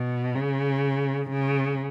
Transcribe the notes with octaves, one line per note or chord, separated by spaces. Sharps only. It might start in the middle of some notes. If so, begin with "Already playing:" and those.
Already playing: B2
C#3
C#3